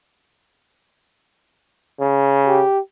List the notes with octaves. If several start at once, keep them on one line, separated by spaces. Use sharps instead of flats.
C#3
G4